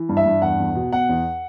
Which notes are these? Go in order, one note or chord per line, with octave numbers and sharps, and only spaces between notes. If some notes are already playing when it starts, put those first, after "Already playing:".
Already playing: E3
G2
E5
G2
E2 F#5
E2
B2
B2 F#5
E2